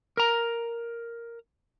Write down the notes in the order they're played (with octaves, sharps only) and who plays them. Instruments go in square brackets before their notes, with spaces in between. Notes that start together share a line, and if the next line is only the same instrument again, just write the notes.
[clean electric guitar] A#4 A#5